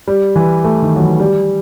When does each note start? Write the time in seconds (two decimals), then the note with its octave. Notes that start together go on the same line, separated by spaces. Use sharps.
0.08 G3
0.36 E3
0.64 A3
0.82 D#3
0.96 F#3
1.02 E3
1.20 G3